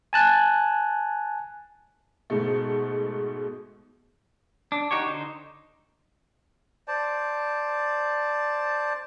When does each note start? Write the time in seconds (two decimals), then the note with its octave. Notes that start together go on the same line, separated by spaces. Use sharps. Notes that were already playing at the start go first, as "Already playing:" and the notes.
0.13 G#5 A5 F#6
2.30 G#2 B2 A3
4.72 D4
4.91 D#4 F#4 G4 C#5
5.06 D3 D#4 C5
6.88 C5 D5 A5